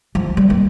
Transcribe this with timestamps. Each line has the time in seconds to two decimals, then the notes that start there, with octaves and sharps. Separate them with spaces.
0.15 F3
0.37 G3
0.50 A#3